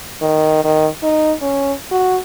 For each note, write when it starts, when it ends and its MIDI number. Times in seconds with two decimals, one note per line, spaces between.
0.22 0.62 51
0.64 0.88 51
1.03 1.34 63
1.42 1.73 61
1.92 2.19 66